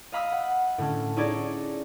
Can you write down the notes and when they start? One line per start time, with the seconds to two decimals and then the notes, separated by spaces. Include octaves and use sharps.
0.12 D#5 F5 B5 D#6 E6
0.32 F#5
0.78 A2 D3 C#4
1.16 C#4 D#4 E4 G#4 C#5 D5